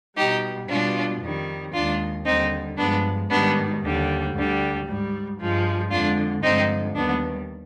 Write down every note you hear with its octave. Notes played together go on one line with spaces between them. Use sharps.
B2 G3 D#4 G4
B2 G3 D4 F4
F2 D#3 G3
D#2 D#3 G#3 D4 F4
D#2 D3 G3 C4 D#4
G2 F3 G#3 B3 D4
G#2 D#3 G3 B3 D4
D#2 D3 G3
D2 D3 G3
G#2 G3
G2 F3 G#3
F2 D3 G#3 D4 F4
G2 D3 F3 G#3 C4 D#4
D#2 D#3 G3 B3 D4